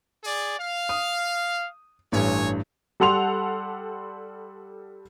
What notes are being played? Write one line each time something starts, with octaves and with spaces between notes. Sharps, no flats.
G#4 D5
F5
D#6
A1 G2 C#5 G#5
G3 A4 F#5 C6 F7